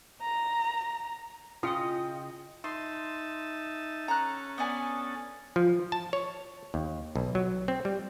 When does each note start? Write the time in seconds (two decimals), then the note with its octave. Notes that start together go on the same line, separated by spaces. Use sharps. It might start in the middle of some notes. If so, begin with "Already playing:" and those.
0.22 A#5
1.63 C#3 F4 D#5 G5 D#6 C#7
2.64 D#4 E5 A5 C6
4.08 C#4 A4 A#5 F#6
4.58 B3 D4 G#5
5.56 F3
5.92 A5
6.13 C#5
6.74 D#2
7.16 B1
7.35 F#3
7.68 C4
7.85 G3